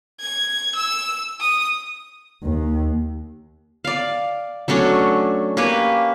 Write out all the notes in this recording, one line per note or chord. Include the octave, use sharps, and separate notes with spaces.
G#6
E6
D#6
D#2
D5 F5
F#3 A3 C#4 D4
A#3 C#4 G4 B4